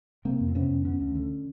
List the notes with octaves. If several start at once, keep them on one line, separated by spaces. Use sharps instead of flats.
C3 A#3 C4
F2
C4
C3 B3 C#4
F2
D3 B3 C#4
D2
D3